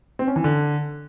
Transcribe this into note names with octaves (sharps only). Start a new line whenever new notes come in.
C4
C#4
E3
D3